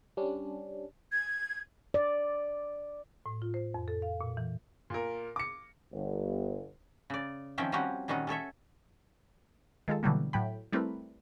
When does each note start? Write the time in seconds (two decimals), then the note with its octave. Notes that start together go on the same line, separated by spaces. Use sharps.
0.17 G3 C#4 D4
1.12 G#6
1.94 D5
3.26 A2
3.42 F4
3.54 C5
3.74 F2
3.88 A4
4.02 F5
4.21 A#2
4.37 E3
4.90 A#2 A#4
5.36 D6 C#7
5.92 G1
7.10 C#3 D5
7.58 D#3 F3 C4 C#4 E5 G5
7.72 F3 G3 C4 C#4 F#4 G4
8.08 A#2 D#3 G3 C#4 F#4
8.27 C#4 A4 C#5 E5
9.88 D#3 G#3 F4 G#4 A4
10.03 B2 D3 E3 F#3 G3 A#3
10.33 A2 F#3 G5 B5
10.73 G3 A3 C4 E4 A#4 B4